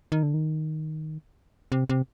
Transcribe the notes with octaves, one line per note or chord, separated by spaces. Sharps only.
D#3
D3
D#3
C3
C3